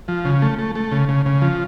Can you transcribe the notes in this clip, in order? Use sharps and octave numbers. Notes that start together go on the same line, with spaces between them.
F3
C#3
A3
A3
A3
C#3
C#3
C#3
F3